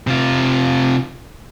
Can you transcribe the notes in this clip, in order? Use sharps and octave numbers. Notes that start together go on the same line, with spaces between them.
C3 F4